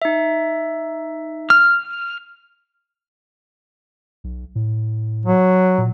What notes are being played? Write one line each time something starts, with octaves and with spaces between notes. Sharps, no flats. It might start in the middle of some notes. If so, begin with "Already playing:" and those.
D#4 E5
F6
B1
A2
F#3
A#2